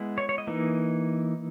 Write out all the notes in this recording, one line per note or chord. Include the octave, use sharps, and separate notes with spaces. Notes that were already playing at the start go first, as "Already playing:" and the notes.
Already playing: G#3 B3 E4
C#5
C#5
D#5
E3 A#3 D#4